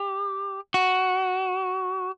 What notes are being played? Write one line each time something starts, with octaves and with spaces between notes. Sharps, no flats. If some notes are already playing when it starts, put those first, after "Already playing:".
Already playing: G4
F#4